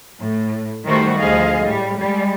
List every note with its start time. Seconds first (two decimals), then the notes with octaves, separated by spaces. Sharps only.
0.19 A2
0.85 D#3 G3 A3 F#4 C5
1.17 D2 F3 G#4 D#5 F5
1.63 A2 G3
1.99 G3 G#3